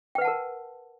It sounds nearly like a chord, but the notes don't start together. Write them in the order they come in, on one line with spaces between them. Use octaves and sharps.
G5 B4 F#5 A5 A#4